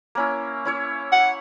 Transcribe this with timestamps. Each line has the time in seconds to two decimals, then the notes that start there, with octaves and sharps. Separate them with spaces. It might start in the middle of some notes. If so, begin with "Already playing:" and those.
0.15 A#3 C#4 E4
0.65 C#4 E4 C#5
1.12 F#5